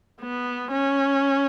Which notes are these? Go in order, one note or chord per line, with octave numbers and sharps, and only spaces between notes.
B3
C#4